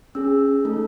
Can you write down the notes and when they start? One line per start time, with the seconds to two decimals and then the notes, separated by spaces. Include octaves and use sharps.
0.15 C#4 G#4 E6
0.65 A3 D#4 A4